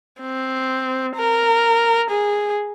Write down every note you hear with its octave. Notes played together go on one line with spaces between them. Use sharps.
C4
A#4
G#4